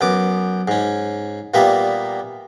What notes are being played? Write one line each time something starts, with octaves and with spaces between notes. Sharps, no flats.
F#2 B3 D6
G#2 C#4
A#2 G3 A#3 B3 E5